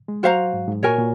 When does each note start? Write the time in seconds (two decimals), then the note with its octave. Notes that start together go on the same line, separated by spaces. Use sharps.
0.08 G#3
0.23 F#3 F#4 C5 F5 A#5
0.53 G#2
0.68 G#2
0.83 A#2 F#4 A#4 C#5 G#5
0.98 A#2